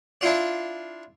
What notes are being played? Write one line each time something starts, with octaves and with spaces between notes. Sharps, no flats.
D4 E4 F4 D5